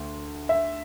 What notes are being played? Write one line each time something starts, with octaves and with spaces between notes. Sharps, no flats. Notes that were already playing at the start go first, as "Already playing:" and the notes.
Already playing: D2
E5